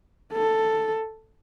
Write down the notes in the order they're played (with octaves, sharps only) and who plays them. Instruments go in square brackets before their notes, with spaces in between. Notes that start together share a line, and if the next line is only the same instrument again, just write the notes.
[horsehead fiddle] A4